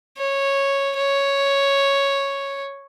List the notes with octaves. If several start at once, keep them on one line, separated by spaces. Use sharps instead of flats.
C#5
C#5